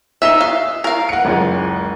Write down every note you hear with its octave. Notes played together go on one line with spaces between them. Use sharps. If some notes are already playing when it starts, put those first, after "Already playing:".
D#4 E5 B6 E7 G7
F5
A#4 F5
F#5 C#7
F#1 C#2